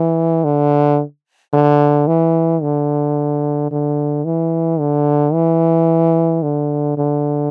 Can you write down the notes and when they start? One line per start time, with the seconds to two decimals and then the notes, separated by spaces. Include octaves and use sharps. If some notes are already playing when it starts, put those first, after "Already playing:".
Already playing: E3
0.44 D3
1.53 D3
2.07 E3
2.62 D3
3.71 D3
4.25 E3
4.79 D3
5.34 E3
6.43 D3
6.98 D3